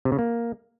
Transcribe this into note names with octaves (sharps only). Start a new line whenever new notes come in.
C3
C#3
A#3